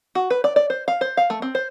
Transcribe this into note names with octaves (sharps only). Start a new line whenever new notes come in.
F#4
B4
D5
D5
C5
F5
C5
F5
A3
C4
C5